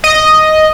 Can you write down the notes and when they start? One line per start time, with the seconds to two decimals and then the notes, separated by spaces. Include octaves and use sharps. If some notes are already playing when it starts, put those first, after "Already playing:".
0.04 D#5